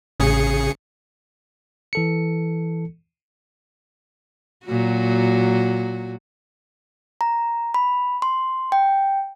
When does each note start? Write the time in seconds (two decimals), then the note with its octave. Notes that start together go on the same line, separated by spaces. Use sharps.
0.20 A1 C#3 G#4 C#7
1.93 E3 A4 C#7
4.66 A#2 F#3 F#4
7.21 A#5
7.74 B5
8.22 C6
8.72 G5